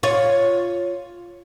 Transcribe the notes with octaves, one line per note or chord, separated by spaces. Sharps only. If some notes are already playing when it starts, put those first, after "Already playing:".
F4 C#5